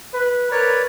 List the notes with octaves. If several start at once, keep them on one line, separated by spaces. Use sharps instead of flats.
B4
A#4 B4 C#5 D5